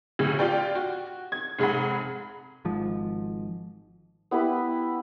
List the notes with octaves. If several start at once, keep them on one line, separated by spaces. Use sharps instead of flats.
D2 A2 C#3
F4 G4 D5 G5
F#4
G#6
F1 G#2 G#4 F#5 B5
G#1 G#2 F3
B3 E4 G4 B4